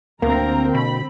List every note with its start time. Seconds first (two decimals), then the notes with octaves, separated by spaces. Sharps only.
0.22 D2 D3 A#3 C4 A#4 A#5
0.75 B2 B5